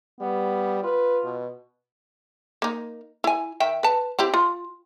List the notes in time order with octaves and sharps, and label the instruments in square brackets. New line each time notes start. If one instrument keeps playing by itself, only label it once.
[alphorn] G3 [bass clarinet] B3
[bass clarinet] F4 [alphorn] B4
[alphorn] B2
[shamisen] A#3 D#4
E4 G#5
D#3 E5 G5
B4 A5
C4 E4 G4
F4